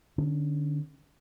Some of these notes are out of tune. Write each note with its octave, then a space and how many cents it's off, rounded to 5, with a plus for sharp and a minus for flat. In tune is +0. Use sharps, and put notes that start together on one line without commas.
D3 +20 C#4 +0